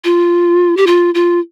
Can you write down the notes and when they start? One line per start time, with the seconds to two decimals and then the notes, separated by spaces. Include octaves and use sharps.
0.04 F4
0.77 G4
0.87 F4
1.14 F4